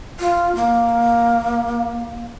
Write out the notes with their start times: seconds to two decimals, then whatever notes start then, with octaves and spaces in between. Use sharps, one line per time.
0.19 F4
0.55 A#3